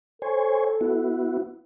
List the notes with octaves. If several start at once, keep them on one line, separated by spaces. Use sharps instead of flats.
A4 C5 C#5 G#5
B3 E4 F#4